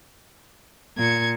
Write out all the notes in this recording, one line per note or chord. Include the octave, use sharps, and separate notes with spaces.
A#2 G#6 C#7